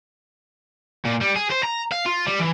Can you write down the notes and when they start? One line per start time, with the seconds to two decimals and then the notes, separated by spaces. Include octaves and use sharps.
1.05 A#2
1.21 G3
1.35 G#4
1.50 C5
1.63 A#5
1.92 F5
2.06 F4
2.26 G3
2.39 E3